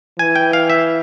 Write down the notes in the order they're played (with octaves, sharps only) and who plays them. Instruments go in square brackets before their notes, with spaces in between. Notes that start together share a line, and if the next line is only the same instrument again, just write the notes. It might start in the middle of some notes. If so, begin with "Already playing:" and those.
[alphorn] E3 [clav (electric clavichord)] G#5
[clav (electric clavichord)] G5
F5
E5